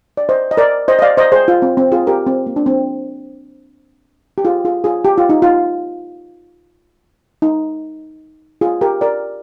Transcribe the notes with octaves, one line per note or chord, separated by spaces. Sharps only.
D5
C5 D#5
D#5
A#4 D5
C5 D#5
D#5
D5 F5
C5 D#5
G#4 C5
F4
C4
C4
F4 G#4
G4 A#4
C4
A#3
D4
C4
G4
F4 G#4
F4 G#4
F4 G#4
G4
F4
D#4
F4
D#4
F4 G#4
G4 A#4
A#4 D5